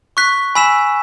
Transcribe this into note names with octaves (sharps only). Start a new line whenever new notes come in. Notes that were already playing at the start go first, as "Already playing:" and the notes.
C#6 F#6 B6
G#5 B5 E6 B6 E7